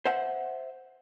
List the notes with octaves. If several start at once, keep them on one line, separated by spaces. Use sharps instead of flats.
C5 E5 F#5